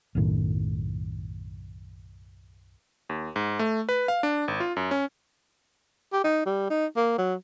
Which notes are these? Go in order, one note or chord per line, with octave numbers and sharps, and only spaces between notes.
B1 F#2 A2 D#3
D#2
G#2
A3
B4
F5
D4
G#1
F4
F#2
C#4
G4
D#4
G3
D#4
A#3
F#3